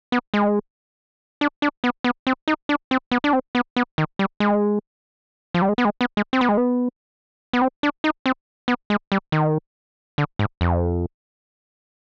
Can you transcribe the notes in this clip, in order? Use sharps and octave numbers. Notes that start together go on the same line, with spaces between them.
B3
G#3
D4
D4
B3
B3
C4
D#4
D4
C4
B3
D4
C4
B3
B3
D#3
G3
G#3
F3
G3
G#3
B3
G#3
B3
G#3
C4
B3
G#3
B3
B3
C4
D4
D#4
C4
B3
G#3
G3
D#3
D3
G#2
F2